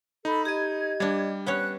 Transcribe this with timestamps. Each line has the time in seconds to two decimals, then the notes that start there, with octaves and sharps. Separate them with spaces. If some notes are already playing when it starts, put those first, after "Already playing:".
0.25 D#4 A4 B5
0.45 G4 D#5 G#6
1.00 G3 D4 F5
1.47 B3 C#4 C#5 F#6